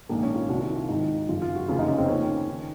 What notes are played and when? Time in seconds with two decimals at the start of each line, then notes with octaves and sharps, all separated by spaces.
0.09 A#1 G#2 D#3 A#3
0.23 C#4
0.35 F4
0.49 C2 C3 D#3 F#4
0.63 F#4
0.76 F4
0.89 G#1 G#2 D#3 D#4
1.29 G#1 F#2 C#3 F4
1.42 F4
1.55 F#4
1.68 F1 D#2 C#3 F4
1.79 D#4
1.88 C#4
1.98 C4
2.08 D#2 D#3 C#4
2.49 D#3